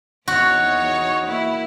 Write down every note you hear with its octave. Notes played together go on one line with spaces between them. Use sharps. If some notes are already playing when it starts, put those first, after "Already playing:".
E2 D#4 F#4 C#5
A#3 E4